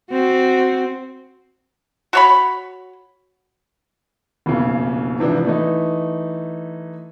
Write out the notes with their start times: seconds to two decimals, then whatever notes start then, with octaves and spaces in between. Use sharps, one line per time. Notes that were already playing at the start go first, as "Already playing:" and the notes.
0.10 C4 F#4
2.13 F#4 C#5 B5
4.46 F1 B1 A#2 C#3
5.19 G#2 C3 E3 F3 D4
5.45 E3 A3 D#4